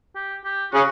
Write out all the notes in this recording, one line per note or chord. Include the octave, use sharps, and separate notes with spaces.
G4
G4
C#3 F#4